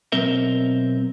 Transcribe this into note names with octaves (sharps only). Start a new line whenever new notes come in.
B1 C4 A#4 E5